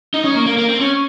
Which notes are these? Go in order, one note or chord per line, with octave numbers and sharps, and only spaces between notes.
D#4
C#4
A#3
A#3
A#3
C4
C#4